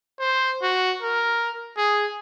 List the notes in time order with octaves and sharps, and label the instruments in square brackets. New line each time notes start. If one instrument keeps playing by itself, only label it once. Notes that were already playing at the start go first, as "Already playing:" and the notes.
[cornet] C5
F#4
A#4
G#4